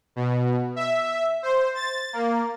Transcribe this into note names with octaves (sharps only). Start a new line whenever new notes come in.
B2
E5
C5
A6
A#3